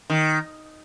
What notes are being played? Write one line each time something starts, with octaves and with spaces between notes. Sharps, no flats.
D#3